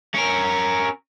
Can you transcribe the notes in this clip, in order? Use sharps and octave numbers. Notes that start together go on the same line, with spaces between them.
C#4 A#4